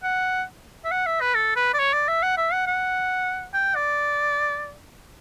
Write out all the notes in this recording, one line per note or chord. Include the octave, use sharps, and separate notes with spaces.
F#5
E5
F#5
E5
B4
A4
B4
D5
C#5
D5
E5
F#5
E5
F#5
F#5
G5
D5